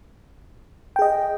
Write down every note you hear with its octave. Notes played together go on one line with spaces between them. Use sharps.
G#4 D#5 G5